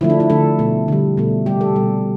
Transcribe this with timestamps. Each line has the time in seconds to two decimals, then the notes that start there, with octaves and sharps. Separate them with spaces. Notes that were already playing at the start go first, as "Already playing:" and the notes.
0.01 D3 F3 A3 E4
0.10 D4
0.20 E4
0.30 D3 F3 A3 A4
0.59 B2 A3
0.88 D3 G3
1.17 B2 A3
1.46 C3 G3 G4
1.61 A4
1.76 B2 G3